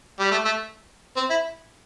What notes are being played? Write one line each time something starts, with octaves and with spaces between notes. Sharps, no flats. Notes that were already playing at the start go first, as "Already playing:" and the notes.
G3
A3
A3
C4
E4